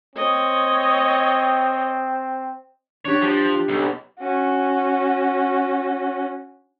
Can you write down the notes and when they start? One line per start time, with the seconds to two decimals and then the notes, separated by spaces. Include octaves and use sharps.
0.16 C4 C#5 D#5
3.05 D4 G4 C#5
3.21 F3
3.68 B1
4.19 C#4 F#4